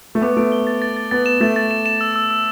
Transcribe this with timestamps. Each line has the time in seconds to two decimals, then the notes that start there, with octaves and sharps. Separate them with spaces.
0.15 A3
0.22 B3 D6
0.37 A3 D7
0.52 G7
0.67 A6
0.82 A6
0.96 A6
1.11 B3 A6
1.26 E7
1.40 A3 A6
1.56 A6
1.71 E7
1.86 E7
2.01 E6
2.16 E6
2.30 E6